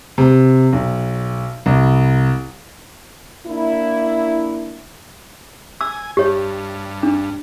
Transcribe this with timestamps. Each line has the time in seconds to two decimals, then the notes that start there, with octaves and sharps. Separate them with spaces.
0.18 C3
0.73 B1
1.66 C2
3.47 A#3 D4 E4
5.81 G#5 E6
6.17 G2 G4 C#5
7.03 D4